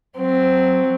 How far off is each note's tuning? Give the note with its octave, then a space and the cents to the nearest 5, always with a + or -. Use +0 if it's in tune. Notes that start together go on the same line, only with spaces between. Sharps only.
F#3 +0 C4 +0